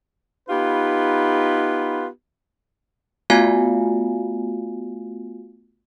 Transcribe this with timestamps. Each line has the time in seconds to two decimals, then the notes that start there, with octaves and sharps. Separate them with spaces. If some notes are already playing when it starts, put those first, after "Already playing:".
0.49 B3 D#4 F4 G4 B4
3.30 A3 B3 F4 F#4 F5 G#5